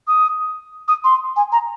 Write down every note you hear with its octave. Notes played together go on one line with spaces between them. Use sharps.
D#6
D#6
C6
G#5
A#5